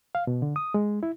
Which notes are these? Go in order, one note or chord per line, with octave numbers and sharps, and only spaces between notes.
F5
B2
D3
D#6
G#3
E4